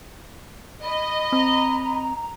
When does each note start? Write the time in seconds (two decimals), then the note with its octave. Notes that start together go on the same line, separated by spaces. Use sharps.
0.84 D#5 B5
1.33 C4 A#5